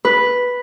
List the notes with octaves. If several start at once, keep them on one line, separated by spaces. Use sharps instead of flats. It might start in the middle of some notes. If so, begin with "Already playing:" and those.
B4